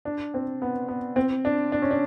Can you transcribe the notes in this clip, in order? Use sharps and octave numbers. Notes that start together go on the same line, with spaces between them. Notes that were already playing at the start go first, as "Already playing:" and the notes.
D4
C4
B3
B3
C4
D4
D4
C#4
D4